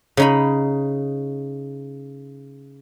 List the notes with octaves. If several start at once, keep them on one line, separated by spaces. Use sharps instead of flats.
C#3 D#4 B5